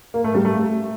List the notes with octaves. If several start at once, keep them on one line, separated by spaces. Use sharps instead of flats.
A#3
A3
G3
A3